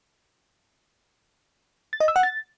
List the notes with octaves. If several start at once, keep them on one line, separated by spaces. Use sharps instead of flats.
A6
D#5
E6
F#5
A6